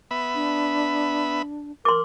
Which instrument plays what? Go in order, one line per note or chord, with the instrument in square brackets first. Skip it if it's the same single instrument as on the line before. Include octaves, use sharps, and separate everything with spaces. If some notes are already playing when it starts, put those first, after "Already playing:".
[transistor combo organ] B3 E5 B5
[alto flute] D4
[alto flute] A#4 [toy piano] C6 D6